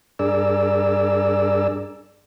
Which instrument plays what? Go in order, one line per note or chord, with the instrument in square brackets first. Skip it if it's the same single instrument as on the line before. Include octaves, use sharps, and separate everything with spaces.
[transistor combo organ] G2 D4 G#4 A#4 D5 E6